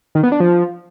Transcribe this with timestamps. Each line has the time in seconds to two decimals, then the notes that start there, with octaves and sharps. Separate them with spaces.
0.15 D#3
0.23 B3
0.32 D4
0.40 F3